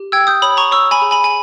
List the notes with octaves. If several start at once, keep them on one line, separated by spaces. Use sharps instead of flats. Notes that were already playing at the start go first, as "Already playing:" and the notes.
Already playing: G4
G5 E6 G#6
D#6 G6
C#5 B5 D#6
A#5 C#6
C#5 C#6 E6
G#5 B5
G#4
G#5 B5
G#5